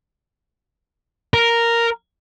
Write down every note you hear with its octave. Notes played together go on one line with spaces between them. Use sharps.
A#4